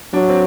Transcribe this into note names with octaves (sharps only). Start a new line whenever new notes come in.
F#3 D4
C4